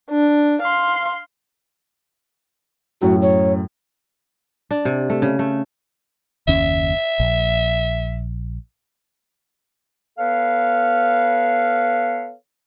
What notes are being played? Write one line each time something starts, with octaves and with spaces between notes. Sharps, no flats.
D4
F5 C6
F#2 A2 F#3 F#4
C#5
D4
C3
A3
C#3
A3
F#1 D#2 C#4 E5
A#1
B3 A4 B4 C#5 F5